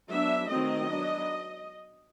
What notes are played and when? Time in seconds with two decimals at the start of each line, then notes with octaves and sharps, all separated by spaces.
0.10 F#3 B3 D4 E5
0.50 D#3 F#3 A3 C4 D#5
0.88 F#3 B3 D4